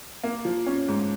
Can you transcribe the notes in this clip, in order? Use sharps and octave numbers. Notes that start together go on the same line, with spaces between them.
A#3
F3
C#4
G#2